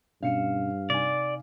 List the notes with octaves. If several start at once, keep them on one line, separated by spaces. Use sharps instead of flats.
G2 B2 C#4 D4 F5 C#7 E7
C3 D#4 D5 G#5